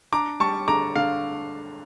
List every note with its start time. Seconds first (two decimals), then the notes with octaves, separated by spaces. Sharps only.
0.12 D4 A#5 D6
0.40 G3 A5 C#6
0.68 D3 A#5 D6
0.96 D3 F5